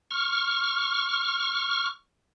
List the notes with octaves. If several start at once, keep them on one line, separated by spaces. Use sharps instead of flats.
C#6 F6